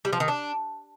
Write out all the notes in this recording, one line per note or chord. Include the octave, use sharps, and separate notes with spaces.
G3
F3
D#3
D4